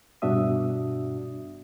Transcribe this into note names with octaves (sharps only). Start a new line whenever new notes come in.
G2 B2 D4 F#4 E5 D#6